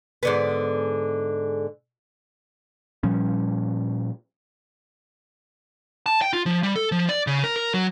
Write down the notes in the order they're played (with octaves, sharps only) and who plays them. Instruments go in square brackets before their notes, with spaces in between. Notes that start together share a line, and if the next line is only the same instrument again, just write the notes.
[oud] G#2 D3 B3
[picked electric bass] A#2 F3 G3 C#4
[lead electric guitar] A5
G5
F4
F3
G3
A4
F3
D5
C#3
A#4
A#4
F#3